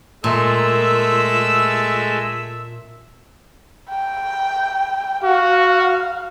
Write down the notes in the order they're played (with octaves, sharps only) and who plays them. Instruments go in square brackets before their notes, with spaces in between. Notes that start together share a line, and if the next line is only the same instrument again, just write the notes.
[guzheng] A#2 [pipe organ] G#3 A3 [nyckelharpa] E5 [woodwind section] A5 E6
[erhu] G5
[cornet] F#4 [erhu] F5